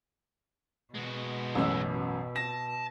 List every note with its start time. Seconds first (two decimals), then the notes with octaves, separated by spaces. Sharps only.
0.94 B2 G#3 F#4
1.55 A1 F#2 E6
2.36 A5 A#6